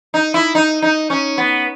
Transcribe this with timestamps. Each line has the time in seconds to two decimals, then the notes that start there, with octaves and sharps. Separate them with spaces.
0.14 D#4
0.34 E4
0.55 D#4
0.82 D#4
1.10 C#4
1.38 B3